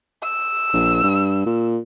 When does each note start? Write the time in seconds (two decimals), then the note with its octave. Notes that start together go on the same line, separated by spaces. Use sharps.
0.23 E6
0.73 A#1
1.03 G2
1.46 A#2